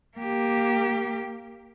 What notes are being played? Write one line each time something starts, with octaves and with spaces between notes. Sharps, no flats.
A#3 G4